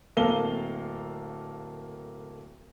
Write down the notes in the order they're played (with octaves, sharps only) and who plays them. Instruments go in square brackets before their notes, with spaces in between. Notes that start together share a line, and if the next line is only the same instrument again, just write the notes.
[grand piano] D1 A#3 A4 F5 G7